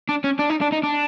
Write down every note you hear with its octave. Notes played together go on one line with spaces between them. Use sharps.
D4
C#4
D4
D#4
D4
D#4
D4